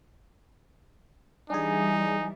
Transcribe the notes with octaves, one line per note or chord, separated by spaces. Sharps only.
E3 G3 D4 D#4 G#4 G#5